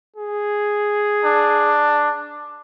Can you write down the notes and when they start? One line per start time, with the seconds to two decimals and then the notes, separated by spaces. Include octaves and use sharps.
0.16 G#4
1.25 D4